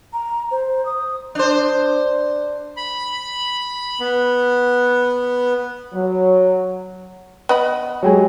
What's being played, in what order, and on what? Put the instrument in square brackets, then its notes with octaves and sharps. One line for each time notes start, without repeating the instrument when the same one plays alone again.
[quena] A#5
C5
D#6
[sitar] D4 C5
[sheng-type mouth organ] B5
B3
[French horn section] F#3
[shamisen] B3 D#5 B5
[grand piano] F#3 G#3 G4 [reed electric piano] C#5 G5 G#5